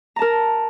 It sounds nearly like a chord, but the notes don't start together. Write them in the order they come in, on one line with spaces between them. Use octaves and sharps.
A#5 A5 A#4